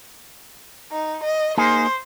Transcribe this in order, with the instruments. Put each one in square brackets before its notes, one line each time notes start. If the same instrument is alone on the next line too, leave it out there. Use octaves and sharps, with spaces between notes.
[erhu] D#4
D#5
[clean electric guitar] A#3 D#4 G#4 [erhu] C5